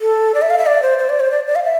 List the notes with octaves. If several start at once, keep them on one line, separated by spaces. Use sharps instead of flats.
A4
D5
E5
F5
E5
D5
C5
C5
D5
C5
D5
D5
F5
E5